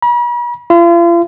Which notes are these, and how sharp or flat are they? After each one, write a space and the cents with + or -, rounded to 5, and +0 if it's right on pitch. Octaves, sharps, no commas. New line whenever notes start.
B5 -45
F4 -40